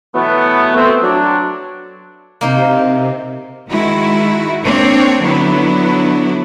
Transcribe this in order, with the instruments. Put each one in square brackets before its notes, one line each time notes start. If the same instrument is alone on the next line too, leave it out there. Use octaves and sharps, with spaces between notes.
[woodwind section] B2 E3 F#3 A3 B3
A3 C4
F#3 D4
[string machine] C3 [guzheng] A#3 D#4 C5
[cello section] D#3 G#3 E4 F#4
A#3 C4 D4 C#5
D3 F#3 B3 E4